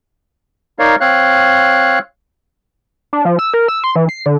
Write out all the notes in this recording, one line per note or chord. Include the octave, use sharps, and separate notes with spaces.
D#4 A#4 C#5 D5 F5
C4 C#5 F5 F#6
D4
F3
E6
A#4
E6
C6
E3
C7
D3